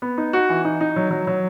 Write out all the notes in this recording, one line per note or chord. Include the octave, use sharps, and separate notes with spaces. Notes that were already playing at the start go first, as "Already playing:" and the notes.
B3
D#4
F#4
E3
D#4
D#4
F#3
F#3
F#3